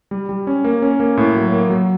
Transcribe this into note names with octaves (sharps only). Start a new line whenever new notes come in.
G3
G3
C#4
A#3
C#4
A#3
A2
F#3
A#3
F#3